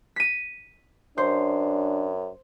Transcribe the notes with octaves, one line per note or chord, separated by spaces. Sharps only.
B6 D#7
F#2 D4 C5